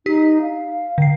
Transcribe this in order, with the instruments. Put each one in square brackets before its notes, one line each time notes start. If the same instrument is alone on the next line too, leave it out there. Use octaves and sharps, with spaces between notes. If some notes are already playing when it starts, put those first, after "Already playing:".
[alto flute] D#4 [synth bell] G4 B6
[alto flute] F5
[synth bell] D3 C7